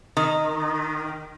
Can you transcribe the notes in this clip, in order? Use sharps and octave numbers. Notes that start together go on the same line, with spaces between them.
D#3